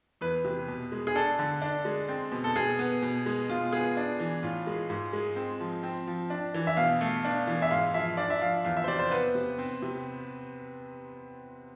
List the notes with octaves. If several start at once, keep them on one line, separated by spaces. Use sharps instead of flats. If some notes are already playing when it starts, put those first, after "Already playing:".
E2 B4
C3
B2
G#3
G#4
D4 A4
D3
D4
G#3
C4
B2
A4
B2 G#4
B3
B2
G#3
B2 F4
B3 G#4
D4
E3
A2 F4
G#3
G#2
G#3
C4
F3
C4
F3
D4
E3
E5
B2 F5
A3
D4
E3
E5
G#2 F5
F3 E5
D4 D5
E5
F3 F5
E2 F5
E5
C5
C3 D5
C5
B3 B4
C3
C4
C3